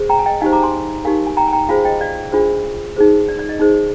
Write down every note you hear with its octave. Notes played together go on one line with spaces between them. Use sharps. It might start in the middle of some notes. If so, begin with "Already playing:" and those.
Already playing: G#4 C5
G5 A#5
G#5
D#5 G5
D#4 G4 C5 F5 G#5
A#5 D6
G#5 C6
D#4 G4 A#4 F5 G#5
G#5
G5 A#5
G#5
G5 A#5
F4 G#4 C5 F5 G#5
D#5 G5
D5 F5
D4 F4 G#4 C5
D#4 G#4 C5
D5
D5
D#5
D#4 G#4 C5